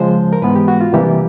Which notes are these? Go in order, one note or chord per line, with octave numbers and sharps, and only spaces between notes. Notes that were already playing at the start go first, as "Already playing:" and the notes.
Already playing: C#3 F3 G#3 C5
A#4
G#2 E3 G#3 B3 B4
G4
F#4
F4
C3 E3 G3 A#3 G4